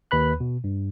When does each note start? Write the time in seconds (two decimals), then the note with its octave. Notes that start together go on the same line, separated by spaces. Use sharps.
0.11 D#2 B4 B5 F#6
0.40 B2
0.64 G2